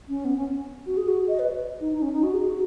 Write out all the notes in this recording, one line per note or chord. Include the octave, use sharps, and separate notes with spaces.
C#4
B3
C#4
F#4
G#4
F#4
D#5
B4
D#4
D#4
C#4
D#4
F#4
G#4
F#4